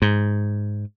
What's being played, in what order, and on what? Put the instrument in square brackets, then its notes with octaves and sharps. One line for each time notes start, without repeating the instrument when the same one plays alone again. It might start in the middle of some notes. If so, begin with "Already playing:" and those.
[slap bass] G#2